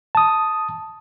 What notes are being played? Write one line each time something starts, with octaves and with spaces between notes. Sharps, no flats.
A5 D#6